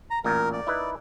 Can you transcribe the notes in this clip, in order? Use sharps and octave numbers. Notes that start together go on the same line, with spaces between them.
A#5
A1 A#2 A#4
D5
D#4 E4 B4